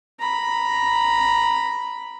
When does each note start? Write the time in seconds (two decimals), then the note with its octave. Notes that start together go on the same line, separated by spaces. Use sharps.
0.19 A#5 B5